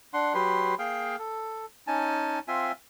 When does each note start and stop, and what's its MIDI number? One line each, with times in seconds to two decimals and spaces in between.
0.13 0.34 62
0.13 0.34 78
0.13 0.34 84
0.34 0.75 54
0.34 0.75 67
0.34 0.75 71
0.34 0.75 84
0.79 1.16 58
0.79 1.16 68
0.79 1.16 77
0.79 1.16 79
1.19 1.66 69
1.87 2.39 61
1.87 2.39 63
1.87 2.39 80
1.87 2.39 81
2.48 2.72 60
2.48 2.72 65
2.48 2.72 76
2.48 2.72 80